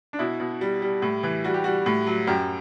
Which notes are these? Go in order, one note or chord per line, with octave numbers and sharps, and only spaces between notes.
D4
B2 E4
B2
G3
G3
A2
E3
G3 F#4
G4
G3 F#4
A2
F#3
F#2 G4